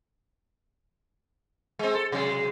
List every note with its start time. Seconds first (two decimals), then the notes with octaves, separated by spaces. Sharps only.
1.79 G#3 C4
1.95 A4
2.12 C3 F#3 G#3